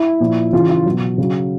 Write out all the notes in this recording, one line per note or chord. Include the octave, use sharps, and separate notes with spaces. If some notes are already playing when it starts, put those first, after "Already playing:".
Already playing: E4
A#2 F3
C#3 E3 F4
F4
B2 F#3
C#3 F#3